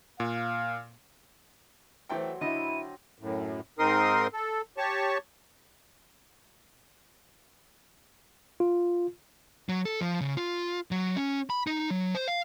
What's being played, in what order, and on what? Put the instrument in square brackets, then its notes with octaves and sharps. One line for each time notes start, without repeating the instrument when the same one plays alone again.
[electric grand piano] A#2 [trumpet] F5
[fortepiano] E3 A3 G5 [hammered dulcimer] F#3 G4 C5
[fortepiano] D3 D#5 [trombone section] E4 [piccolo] D#7
[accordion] F#2 A2
G#2 C4 D#4 A#4 C6 D#6
A4
G4 C#5 A5 C#6
[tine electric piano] F4
[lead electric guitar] F#3
A4
F3
C#3
F4
F#3
C#4
B5
D#4
F#3
C5
F5